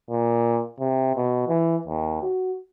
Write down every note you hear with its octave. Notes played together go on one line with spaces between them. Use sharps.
A#2
C3
B2
E3
D#2
F#4